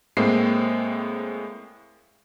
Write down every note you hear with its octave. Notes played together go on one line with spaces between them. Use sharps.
A2 G#3 A#3 C4 C7